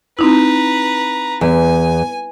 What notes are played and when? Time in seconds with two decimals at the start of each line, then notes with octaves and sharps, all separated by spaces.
0.19 C4 D#4 E4 B4 A#5
1.41 E2 G#5